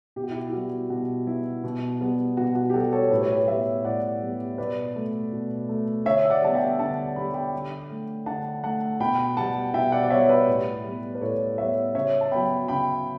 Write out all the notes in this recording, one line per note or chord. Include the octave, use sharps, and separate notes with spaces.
B2 G4
F#4
E4 G4
E4
G3 B3 F#4
B2 F#4
G3 B3 E4
B2
G3 B3
B2 F#4
F#4
G4
G3 B3 F#4 A4
A4 C#5
A2 B4
C#5
G4 B4
G3 B3 C#5 E5
A2 D5 F#5
G3 B3
B2 B4 D5
A3
B2
A3
D3 C#5 E5
E5
D5 F#5
G3 B3 A5
E5 G5
D3 F#5 A5
G3 B3 B5
G5 B5
D3
A3
D3 F#5 A5
A3 F#5 A5
B2 G5 B5
G3 B3 F#5 A5
B2 E5 G5
D5 F#5
D5
G3 B3 C#5 E5
B4 D5
A2
G3 B3
B4
A2 A4 C#5
G3 B3 C#5 E5
C#3 C#5 E5
A5
F#3 B3 G5 B5
C#3 G5 B5